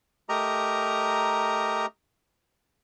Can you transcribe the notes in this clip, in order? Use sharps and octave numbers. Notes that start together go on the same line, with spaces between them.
A3 G4 A#4 D#5 A#5